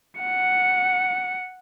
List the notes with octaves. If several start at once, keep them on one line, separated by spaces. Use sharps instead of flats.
F#5 C#7